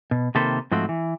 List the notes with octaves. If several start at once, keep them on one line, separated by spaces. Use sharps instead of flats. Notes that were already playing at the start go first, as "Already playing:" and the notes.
B2
C3 D#3 A#3 A4 B4 C5
G#2 F3 A3 C4 F#4
E3